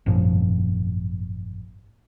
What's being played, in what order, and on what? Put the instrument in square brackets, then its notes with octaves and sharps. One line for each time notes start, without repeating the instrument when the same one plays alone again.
[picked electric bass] G#1 F#2 A#2 F3